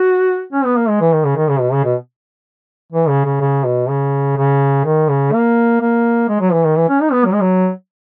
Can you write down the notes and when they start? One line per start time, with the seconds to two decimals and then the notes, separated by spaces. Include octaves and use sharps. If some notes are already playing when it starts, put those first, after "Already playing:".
Already playing: F#4
0.53 C#4
0.65 B3
0.76 A#3
0.89 G#3
1.01 E3
1.13 D#3
1.24 C#3
1.36 D#3
1.49 C#3
1.60 B2
1.73 C#3
1.84 B2
2.92 E3
3.08 C#3
3.25 C#3
3.41 C#3
3.65 B2
3.89 C#3
4.37 C#3
4.85 D#3
5.09 C#3
5.33 A#3
5.81 A#3
6.28 G#3
6.40 F#3
6.53 E3
6.65 D#3
6.77 E3
6.89 C#4
7.00 D#4
7.12 B3
7.25 F#3
7.32 G#3
7.41 F#3